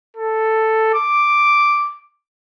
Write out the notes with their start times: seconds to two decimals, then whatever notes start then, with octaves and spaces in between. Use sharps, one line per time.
0.17 A4
0.94 D6